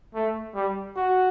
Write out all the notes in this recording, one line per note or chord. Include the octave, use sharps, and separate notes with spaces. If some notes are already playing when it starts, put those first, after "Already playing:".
A3
G3
F#4